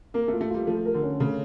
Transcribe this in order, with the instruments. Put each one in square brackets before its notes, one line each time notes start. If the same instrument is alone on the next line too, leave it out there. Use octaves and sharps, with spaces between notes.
[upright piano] A#3 [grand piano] A#4
[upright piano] A3
[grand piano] F4
[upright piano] A3
[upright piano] G3 [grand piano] F4
[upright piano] F3 [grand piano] A3
[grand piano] A#4
[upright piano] D3
[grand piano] C#4
[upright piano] C#3 [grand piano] A3